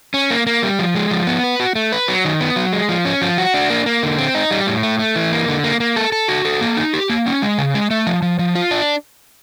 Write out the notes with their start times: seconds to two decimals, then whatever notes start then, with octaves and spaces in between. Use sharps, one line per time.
0.14 C#4
0.31 A#3
0.47 A#3
0.63 G3
0.79 F3
0.95 G#3
1.11 F3
1.27 B3
1.44 B4
1.60 F#4
1.75 A3
1.92 B4
2.08 F#3
2.25 D#3
2.40 B3
2.56 F#3
2.73 G#3
2.89 F3
3.05 C#4
3.22 F3
3.38 F#4
3.54 D4
3.70 A#3
3.86 A#3
4.03 D3
4.18 C4
4.35 D#4
4.51 G3
4.67 A2
4.83 A3
4.99 A3
5.16 E3
5.32 A#3
5.48 D3
5.64 A#3
5.80 A#3
5.96 A4
6.12 A4
6.28 F#4
6.45 A4
6.61 A#3
6.77 D#4
6.93 G4
7.10 A#3
7.26 C#4
7.42 G#3
7.58 C#3
7.74 G#3
7.91 A3
8.07 F3
8.22 F3
8.39 F3
8.55 F4
8.71 D4